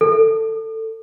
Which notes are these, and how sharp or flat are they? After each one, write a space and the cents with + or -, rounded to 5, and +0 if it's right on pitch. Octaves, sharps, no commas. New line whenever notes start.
A4 +15